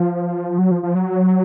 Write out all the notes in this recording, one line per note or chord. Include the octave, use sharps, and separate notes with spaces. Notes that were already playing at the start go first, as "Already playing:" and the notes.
Already playing: F3
F#3
F3
F3
F#3